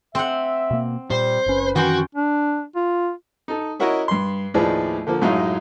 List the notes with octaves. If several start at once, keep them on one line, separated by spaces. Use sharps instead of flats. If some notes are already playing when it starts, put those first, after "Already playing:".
C4 E5 F#5
B2 A#3
A#2 G3 C5
F#1 C#4 B4
F#2 D#3 E3 F#4 G5 C6
D4
F4
D#4 A4
C#4 E4 F#4 A#4 C#5 D#5
G2 C6
D#2 A2 F3 G#4 B4 D5
D3 F3 A#3
F#2 A2 F#3 G#3 D#4 F4